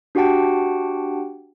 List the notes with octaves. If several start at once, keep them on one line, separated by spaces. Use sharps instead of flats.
D4 F#4 G4 F#5 G5 A5